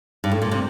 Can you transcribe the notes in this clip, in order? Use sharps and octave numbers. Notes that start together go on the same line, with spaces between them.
G2
A2
A#2
C3